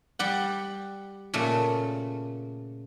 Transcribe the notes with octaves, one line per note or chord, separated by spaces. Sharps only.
G3 G4 F#5
A#2 C#3 A3